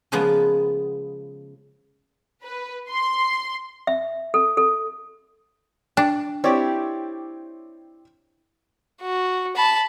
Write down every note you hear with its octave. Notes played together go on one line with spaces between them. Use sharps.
C#3 F3 G#3 A#3 B3
B4
C6
E5
A4
A4
D4 G5
C4 E4 G4 C#5 D5
F#4
A5 B5